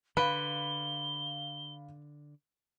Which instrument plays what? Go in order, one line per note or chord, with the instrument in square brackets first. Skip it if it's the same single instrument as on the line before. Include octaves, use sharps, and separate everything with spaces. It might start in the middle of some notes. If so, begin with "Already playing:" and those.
[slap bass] D3 [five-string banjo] B4 [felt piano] F5 B5 [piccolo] G7